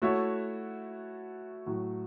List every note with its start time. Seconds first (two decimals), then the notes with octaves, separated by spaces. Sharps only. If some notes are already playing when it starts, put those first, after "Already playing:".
0.02 A3 E4 F#4 A4 C#5 E5
1.66 A2 F#3 A3